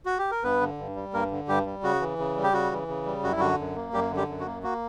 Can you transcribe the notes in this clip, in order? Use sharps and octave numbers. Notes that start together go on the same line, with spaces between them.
F#4
G4
A#4
G2 B3 B4
D3
G2
G3
G2 A#3 A#4
D3
G2 G3 G4
G3
C#3 F#4
E3
C#3
G3
G4
C#3 F#4
E3
C#3
G3
F#2 F#4
E4
D3 F#4
F#2
A#3
F#2 G3 G4
D3
G3 G4
F#2
F#4
A#3
A#3 F#4